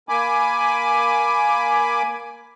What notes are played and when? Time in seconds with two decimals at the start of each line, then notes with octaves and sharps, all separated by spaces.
0.09 A#3 G#5 B5 D6